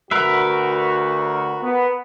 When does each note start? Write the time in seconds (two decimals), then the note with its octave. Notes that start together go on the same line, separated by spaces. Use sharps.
0.11 D2 F#4 A#4 B4 E5
1.62 B3